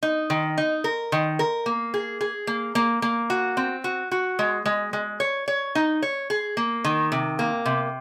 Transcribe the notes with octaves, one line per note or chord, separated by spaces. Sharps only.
D#4
D#3
D#4
A#4
D#3
A#4
A#3
G#4
G#4
A#3
A#3
A#3
F#4
C4
F#4
F#4
G#3
G#3
G#3
C#5
C#5
D#4
C#5
G#4
A#3
D#3
C3
A#3
C3